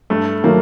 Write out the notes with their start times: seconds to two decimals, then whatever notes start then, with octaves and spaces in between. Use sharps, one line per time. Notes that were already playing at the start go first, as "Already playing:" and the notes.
0.10 G2 A3
0.43 D#3 F#3 A3 A#3